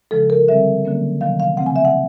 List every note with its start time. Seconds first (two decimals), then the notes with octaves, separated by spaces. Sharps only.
0.11 C#3 F3 G#3 A4
0.30 A#4
0.48 D3 G3 C4 E5
0.85 D3 F#3 A#3 C#4
1.21 C3 D#3 F#3 B3 F5
1.40 F5
1.57 C#3 F3 A3 C4 F#5
1.66 G#5
1.76 E5
1.85 F#5